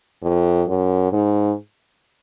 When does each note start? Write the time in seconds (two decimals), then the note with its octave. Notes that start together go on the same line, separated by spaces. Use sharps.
0.23 F2
0.68 F#2
1.13 G#2